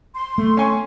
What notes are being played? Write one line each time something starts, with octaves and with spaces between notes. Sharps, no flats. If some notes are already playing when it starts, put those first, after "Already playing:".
C6
A3
C#4 G#5 C#6